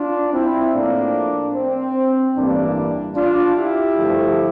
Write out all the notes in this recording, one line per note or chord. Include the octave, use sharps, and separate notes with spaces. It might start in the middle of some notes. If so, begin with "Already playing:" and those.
Already playing: D4 F4
C4 E4
A2 F3 A#3 D4
C4
A1 G2 E3 G3 A#3 D4
D4 F4
E4 G4
G2 D3 F3 A3